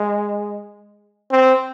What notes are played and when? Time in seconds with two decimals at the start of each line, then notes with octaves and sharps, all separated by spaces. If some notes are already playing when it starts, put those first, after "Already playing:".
Already playing: G#3
1.31 C4